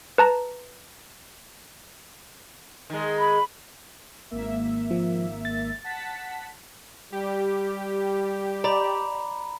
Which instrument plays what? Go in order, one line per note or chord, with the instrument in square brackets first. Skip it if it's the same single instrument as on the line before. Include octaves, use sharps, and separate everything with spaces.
[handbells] B4 A5 A#5
[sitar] D#3 G#3
[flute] B5
[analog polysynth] G#1 A#3 E5
[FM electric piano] F3
A6
[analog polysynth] F#5 A5 B6
[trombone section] G3 [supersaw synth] G4
[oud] D5 [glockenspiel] A#5 B5